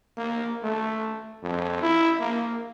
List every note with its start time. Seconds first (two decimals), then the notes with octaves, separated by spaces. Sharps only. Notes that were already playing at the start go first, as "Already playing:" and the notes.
0.17 A#3
0.63 A3
1.43 F2
1.82 E4
2.20 A#3